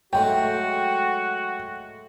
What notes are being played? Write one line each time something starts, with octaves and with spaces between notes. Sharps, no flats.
F#3 G#3 A3 F#4 G5